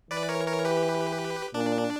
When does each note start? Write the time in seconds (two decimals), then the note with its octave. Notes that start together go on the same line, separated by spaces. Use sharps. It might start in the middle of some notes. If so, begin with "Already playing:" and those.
0.11 E3 B4 D5
0.29 A#4 C#5
0.47 A#4 C#5
0.65 G4 B4
1.54 A#2 D4